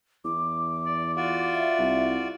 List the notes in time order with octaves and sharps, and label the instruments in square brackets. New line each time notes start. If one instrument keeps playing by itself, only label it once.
[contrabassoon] E2 [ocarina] D6
[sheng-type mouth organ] D5
F4 F#4 D5
[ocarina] E5
[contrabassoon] C2